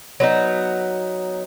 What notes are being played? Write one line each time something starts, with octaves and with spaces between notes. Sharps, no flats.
F#3 B3 D#4